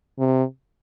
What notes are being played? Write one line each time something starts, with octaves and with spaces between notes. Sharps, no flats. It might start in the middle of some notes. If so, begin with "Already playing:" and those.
C3